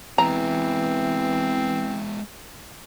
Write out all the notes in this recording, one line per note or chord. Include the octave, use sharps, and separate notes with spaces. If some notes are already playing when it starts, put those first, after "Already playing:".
E3 G#3 B3 C4 A#5